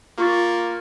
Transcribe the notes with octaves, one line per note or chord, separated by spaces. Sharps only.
A#3 F4 C#6 A6